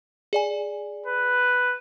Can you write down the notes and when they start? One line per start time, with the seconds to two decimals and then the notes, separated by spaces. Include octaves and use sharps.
0.33 G#4 D5 G#5
1.06 B4